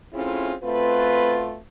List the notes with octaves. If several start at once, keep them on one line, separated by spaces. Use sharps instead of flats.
A3 C4 C#4 E4 F4 G#4
B2 A3 C4 F4 B4